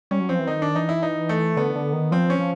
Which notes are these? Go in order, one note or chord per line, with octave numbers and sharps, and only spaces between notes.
G3 C#4
F#3
F3 C4
E3
D#3 D#4
D4
E3 D#4
E4
D#4
A3
D3 B3
D3
D#3
F3 C4
C#4
F3